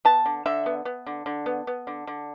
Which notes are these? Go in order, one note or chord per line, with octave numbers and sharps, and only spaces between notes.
B3 A5
D3
D3 E5
B3
B3
D3
D3
B3
B3
D3
D3